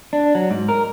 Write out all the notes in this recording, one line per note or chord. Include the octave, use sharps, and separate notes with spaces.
D4
F#3
G#2
A#4